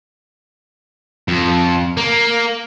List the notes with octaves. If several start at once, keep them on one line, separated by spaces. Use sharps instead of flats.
F2
A#3